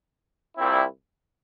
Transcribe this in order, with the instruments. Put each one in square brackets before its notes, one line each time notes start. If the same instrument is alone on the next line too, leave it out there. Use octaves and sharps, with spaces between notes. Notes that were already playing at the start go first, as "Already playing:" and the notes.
[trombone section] C2 A#2 G3 C4 E4